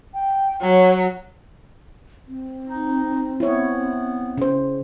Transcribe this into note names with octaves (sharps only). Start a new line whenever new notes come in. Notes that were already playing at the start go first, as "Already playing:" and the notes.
G5
F#3 C#5
C4
D#4
B3 E4 C#5
C#3 C5